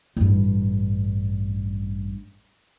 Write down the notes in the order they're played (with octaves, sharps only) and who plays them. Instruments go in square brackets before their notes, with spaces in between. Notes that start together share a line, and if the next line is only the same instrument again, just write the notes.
[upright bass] A1 G2